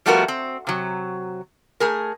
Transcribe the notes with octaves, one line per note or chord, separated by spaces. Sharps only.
F3 G3 A3 B3 F#4 A#4
C4
C3 F#3
A3 G#4 A#4